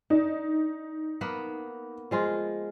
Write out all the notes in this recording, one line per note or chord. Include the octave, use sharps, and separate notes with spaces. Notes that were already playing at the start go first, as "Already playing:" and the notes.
D4 D#4
A#3 B3 B4
F3 G#3 F4